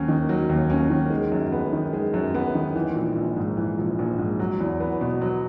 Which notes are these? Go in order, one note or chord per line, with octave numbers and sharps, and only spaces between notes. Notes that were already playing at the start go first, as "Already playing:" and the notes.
Already playing: D#2 F#3 C#4
D#3
F#3
D#2
C#4
D#3
G#3
F#2
B3
D#3
G#3
F#2
B3
D#3
E3
A#1
A#1
G#2
E3
A#1
A#1
G#2
F#3
E2
B3
B2
F#3